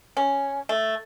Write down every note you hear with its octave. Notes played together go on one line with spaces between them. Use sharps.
C#4
A3